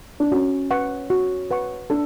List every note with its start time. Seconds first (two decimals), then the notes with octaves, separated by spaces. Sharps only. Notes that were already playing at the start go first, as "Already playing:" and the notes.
0.20 D4
0.31 C#4 F#4
0.71 B4 F#5 C#6
1.10 F#4
1.51 B4 F#5 C#6
1.90 D4 A4